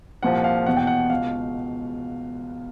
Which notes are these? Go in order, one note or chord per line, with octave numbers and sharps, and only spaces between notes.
C2 A#2 F3 F#5
F5
E1 E2 B2 F#5
G5
F#5
C#2 B2 F5